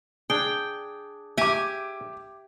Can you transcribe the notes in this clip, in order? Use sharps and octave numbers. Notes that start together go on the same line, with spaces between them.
D4 G#4 G5
G4 E5 G#5 D6